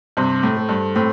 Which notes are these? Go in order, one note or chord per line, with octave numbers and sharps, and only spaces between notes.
G2 C3 C5
A2
A4
G2
A2 C4